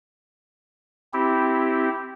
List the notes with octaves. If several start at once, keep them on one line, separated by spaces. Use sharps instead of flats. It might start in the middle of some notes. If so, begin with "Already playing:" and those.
C4 E4 G4